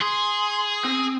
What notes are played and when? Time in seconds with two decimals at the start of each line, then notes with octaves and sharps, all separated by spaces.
0.01 G#4 C6
0.84 C4